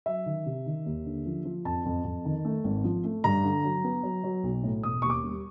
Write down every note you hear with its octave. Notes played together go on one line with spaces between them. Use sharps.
F#3 E5
D#3
C3
D#3
D#2
D3
F3
F3
F2 A5
F2
F2
D#3
A3
G#1
F3
A3
G2 A#5
D3
F#3
B3
F#3
F#3
B1
A2
E1 D#6
D#2 C#6
D6
G3